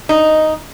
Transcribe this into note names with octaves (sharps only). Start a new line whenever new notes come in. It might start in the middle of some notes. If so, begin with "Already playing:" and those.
D#4